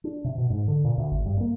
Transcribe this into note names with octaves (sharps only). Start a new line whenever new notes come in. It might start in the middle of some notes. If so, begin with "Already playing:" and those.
D4
C3
B2
G#2
D3
A#2
D2
G#1
G2
A#3